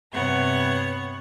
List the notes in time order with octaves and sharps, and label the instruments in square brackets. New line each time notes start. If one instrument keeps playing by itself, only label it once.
[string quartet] G2 C3 B3 C#5 F#5 G#6